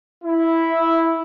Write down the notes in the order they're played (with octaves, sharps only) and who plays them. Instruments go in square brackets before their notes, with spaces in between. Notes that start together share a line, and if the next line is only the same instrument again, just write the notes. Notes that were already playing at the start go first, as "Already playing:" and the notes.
[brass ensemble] E4